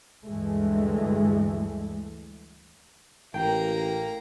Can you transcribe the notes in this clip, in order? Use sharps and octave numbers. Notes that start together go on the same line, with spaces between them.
D2 G2 E3 G#3 A3
A1 A#3 G5 A#5